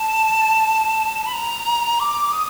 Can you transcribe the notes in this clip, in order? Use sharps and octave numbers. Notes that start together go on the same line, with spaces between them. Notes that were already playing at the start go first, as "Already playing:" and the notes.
Already playing: A5
B5
A#5
D6
D#6